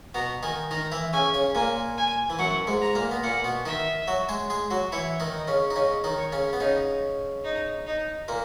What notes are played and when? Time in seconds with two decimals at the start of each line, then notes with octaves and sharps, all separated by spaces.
0.14 B2 B3 A#5
0.43 D#3 D#4 G#5
0.71 D#3 D#4 A#5
0.92 E3 E4
1.13 C#3 C#4 G#5
1.34 C#3 C#4
1.55 A#2 A#3 G#5
1.97 G#5
2.30 E3
2.39 F#2 F#3 F#5
2.67 G#2 G#3
2.81 A#5
2.95 A#2 A#3
3.11 B3
3.23 A#2 A#3 F#5
3.44 B2 B3
3.66 D#3 D#4 E5
4.08 F#3 F#4
4.29 G#3 G#4
4.50 G#3 G#4
4.71 F#3 F#4
4.92 E3 E4 C#5
5.20 D#3 D#4
5.34 D#5
5.48 C#3 C#4
5.70 D#4
5.76 C#3 C#4 D#5
6.04 D#3 D#4
6.18 C#5
6.32 C#3 C#4
6.53 B3
6.60 C#3 C#4 D#4
7.44 D#4
7.86 D#4
8.28 A#2 A#3